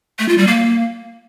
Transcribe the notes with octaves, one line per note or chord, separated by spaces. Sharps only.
A3
F4
G3
A#3